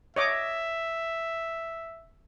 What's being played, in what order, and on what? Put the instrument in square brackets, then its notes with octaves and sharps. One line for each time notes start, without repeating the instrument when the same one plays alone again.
[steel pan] C#5 D#5 D6 [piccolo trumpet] E5